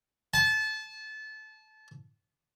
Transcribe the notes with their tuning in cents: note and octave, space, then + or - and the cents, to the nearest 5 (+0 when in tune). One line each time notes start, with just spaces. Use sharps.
A5 -25